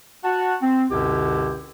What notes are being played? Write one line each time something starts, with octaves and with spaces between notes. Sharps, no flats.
F#4 F#5 A5
C4
C#2 F#2 B2 D3 E4 G4